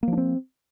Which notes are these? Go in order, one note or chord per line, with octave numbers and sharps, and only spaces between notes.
F3 A#3 C4 D4